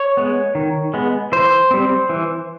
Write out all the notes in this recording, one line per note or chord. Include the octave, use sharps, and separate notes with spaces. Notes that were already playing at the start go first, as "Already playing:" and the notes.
Already playing: C#5
G#3 B3
D#3
G#3 B3
E3 C5
G3 C4
E3